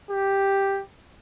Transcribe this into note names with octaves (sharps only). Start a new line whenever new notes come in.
G4